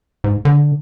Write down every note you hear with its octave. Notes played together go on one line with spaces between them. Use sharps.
G#2
D3